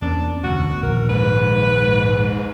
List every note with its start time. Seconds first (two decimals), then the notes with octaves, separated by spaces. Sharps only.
0.02 E2 A#3 C#4 D4
0.44 E1 D2 G2 F#4
0.83 A#1 D#2 A#4
1.09 G#2 B4